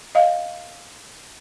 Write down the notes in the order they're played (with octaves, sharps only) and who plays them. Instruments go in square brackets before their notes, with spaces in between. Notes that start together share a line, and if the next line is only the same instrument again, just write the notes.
[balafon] D#5 F5